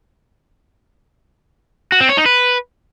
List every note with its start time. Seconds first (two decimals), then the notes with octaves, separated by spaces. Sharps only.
1.92 F#4
2.01 C4
2.09 C#5
2.17 D#4
2.26 B4